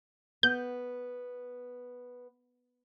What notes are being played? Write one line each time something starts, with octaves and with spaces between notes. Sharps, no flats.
B3 G6